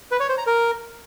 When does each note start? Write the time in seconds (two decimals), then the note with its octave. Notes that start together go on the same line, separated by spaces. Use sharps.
0.11 B4
0.20 C#5
0.29 C5
0.38 A#5
0.47 A#4